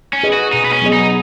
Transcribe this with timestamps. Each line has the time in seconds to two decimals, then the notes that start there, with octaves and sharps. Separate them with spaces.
0.13 C#4
0.23 G#4 B4 D#5
0.33 F#4
0.52 B2 D#4
0.65 B3
0.73 C#4
0.82 F#3 B3 G#4 D#5
0.93 D#4